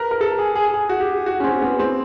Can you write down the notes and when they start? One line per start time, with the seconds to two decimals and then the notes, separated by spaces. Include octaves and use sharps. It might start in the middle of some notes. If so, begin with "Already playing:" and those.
Already playing: A#4 B4
0.11 A#4
0.21 A4
0.38 G#4
0.56 G#4
0.74 G#4
0.89 F#4
1.00 G4
1.26 F#4
1.40 C#4
1.44 C4
1.61 B3
1.79 C4